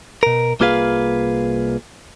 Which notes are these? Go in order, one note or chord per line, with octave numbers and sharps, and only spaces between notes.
B2 A#4
C2 A#3 F4 G#4 B4 F5